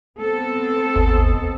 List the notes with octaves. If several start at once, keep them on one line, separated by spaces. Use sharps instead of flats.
B3 C4 A4
G#1 D#2